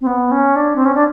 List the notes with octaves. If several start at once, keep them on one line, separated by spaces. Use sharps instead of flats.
C4
B3
C#4
D4
C4
C#4
D4